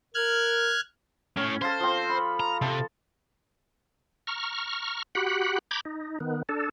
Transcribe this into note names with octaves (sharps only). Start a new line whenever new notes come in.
A#4 F6 F#6 G#6
A2 C#4
A4 C5 F5 C6
F3 C4
B5
A#5
C3 A4
A#5 C#6 F6
F#4 G4 F#5 B5
A#5 B5 D6 G6 G#6
D#4
D#3 B3
D4 A4